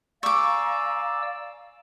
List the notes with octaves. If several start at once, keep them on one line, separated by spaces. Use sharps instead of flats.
D5 F5 G#5 A#5 C#6 D6 E6